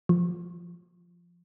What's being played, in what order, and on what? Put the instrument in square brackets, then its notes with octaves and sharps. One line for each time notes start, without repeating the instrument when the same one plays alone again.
[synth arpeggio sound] F3